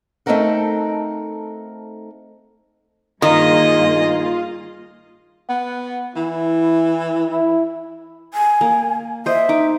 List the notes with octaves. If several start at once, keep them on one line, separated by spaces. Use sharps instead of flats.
A3 C4 D#4 A4 A#4 F#5
G2 D#3 A#3 F4 G#4 D#5
B3 F#5
E3 E4
E4
G#5
A#3
C5 D#5 E5
D#4 D6